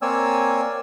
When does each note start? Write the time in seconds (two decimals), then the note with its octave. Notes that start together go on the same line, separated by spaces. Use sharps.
0.02 A#3 C4 C#5 D5 G#5 E6